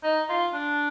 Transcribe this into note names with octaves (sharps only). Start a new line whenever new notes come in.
D#4
F4
D4